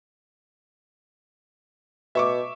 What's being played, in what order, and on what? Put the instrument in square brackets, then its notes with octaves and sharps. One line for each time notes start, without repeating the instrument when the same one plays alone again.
[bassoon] B2 [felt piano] E5 C#6 D6